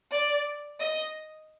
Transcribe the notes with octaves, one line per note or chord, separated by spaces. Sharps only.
D5
D#5